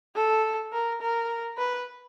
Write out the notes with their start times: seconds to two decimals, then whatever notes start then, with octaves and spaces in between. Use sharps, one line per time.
0.15 A4
0.73 A#4
1.01 A#4
1.58 B4